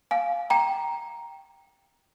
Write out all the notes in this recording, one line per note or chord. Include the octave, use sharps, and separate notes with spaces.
F5 G#5
G5 A#5